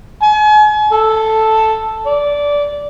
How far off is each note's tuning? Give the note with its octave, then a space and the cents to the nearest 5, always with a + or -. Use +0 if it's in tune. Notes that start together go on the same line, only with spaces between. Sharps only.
G#5 +40
A4 +0
D5 -15